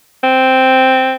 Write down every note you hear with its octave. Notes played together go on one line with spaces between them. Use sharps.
C4